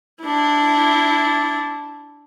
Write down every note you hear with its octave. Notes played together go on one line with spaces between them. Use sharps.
D4 E4